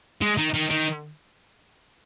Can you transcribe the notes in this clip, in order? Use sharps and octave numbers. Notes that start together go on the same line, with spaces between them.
G#3
D#3
D#3
D#3